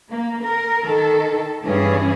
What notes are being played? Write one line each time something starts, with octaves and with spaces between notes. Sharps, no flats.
A#3
A#4
D#3 A4
G2 E3 C#4 G#4